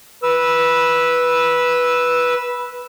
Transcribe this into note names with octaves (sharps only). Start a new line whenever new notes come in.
B4 E6